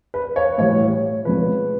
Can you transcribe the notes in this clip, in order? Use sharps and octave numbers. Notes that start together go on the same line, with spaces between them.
B4
C#5
A2 E3 G3 C#5
C#2 C#3 F3 B4